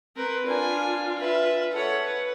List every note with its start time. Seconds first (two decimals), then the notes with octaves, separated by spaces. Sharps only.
0.16 C4 A#4 B4
0.47 D4 F4 G#5
1.20 B4 E5
1.73 A4 C#5 F#5
2.02 B4